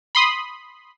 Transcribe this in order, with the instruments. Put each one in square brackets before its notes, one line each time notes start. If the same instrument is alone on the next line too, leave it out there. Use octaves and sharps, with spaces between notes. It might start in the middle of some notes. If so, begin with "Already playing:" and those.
[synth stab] B5 C6 D#6